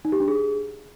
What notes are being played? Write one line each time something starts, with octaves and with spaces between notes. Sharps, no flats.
D#4
G4
D4
G#4